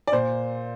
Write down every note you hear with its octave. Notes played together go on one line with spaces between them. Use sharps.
D5
A#2 C5